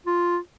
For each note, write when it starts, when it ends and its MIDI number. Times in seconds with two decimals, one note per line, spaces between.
0.06 0.37 65